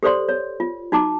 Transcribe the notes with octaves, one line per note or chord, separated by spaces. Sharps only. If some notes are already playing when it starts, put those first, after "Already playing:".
G4 A4 C5 D5 C6
C#5
F4
D#4 F#4 A5 A#5 D6